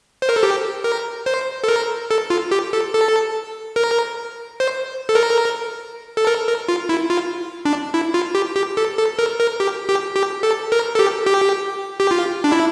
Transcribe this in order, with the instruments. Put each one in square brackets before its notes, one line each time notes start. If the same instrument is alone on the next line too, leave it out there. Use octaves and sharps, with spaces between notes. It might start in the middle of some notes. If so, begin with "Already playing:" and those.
[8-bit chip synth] C5
A#4
A4
G4
A#4
C5
A4
A#4
A4
F4
G4
A4
A4
A#4
C5
A4
A#4
A4
A#4
A#4
F4
E4
F4
D4
E4
F4
G4
G4
A4
A4
A#4
A#4
G4
G4
G4
A4
A#4
A4
G4
G4
G4
F4
D4
E4